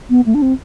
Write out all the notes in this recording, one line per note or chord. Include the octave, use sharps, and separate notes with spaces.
B3
A3
D4
C4